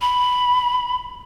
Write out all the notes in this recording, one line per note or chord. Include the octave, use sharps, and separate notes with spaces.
B5